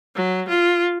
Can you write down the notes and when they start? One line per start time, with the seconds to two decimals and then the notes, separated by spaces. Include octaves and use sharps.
0.16 F#3
0.49 F4